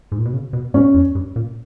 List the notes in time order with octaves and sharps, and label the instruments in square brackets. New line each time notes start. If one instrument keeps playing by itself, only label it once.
[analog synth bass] G#2
A#2
B2
C#3
B2
[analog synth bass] G#2 [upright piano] C#4
[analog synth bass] E2
G2
A#2